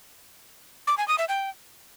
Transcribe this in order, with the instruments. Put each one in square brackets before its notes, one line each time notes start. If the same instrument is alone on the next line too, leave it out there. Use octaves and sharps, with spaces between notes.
[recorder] D6
G#5
D#6
E5
G5